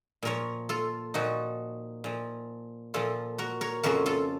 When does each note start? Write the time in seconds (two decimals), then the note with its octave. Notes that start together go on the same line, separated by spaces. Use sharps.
0.23 A#2 F3 A#4 C#5
0.69 F4 A4
1.14 A#2 F3 D#4 F#4
2.04 A#2 F3
2.94 A#2 F3 F4 A4
3.38 F#4 A#4
3.61 A#4 C#5
3.83 F2 C#3 F3 F#4 A#4
4.06 F4 A4